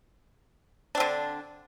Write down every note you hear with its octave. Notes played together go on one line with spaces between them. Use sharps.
D3 C4 D4